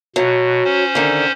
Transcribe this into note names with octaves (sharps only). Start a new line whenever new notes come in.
B2 F#3
C#4 C5
D3 D#3